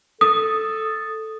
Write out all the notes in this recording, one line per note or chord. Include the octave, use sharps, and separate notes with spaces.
A4 D#6